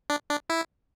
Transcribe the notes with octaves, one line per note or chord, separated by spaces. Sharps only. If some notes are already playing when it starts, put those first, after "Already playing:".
D4
D4
E4